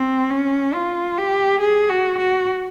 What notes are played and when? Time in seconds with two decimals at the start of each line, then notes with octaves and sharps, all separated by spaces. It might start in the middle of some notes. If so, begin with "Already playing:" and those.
Already playing: C4
0.31 C#4
0.74 F4
1.18 G4
1.61 G#4
1.90 F#4
2.18 F#4